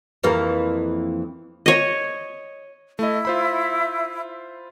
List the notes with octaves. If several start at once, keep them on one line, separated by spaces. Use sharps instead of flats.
F2 E3 A#3
C#5 D#5
A3 E4 D#5
F4 C5 B5